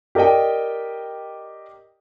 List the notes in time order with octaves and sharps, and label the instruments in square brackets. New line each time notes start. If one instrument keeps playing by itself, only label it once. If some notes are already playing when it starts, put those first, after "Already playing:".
[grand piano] G4 A#4 D5 D#5 G5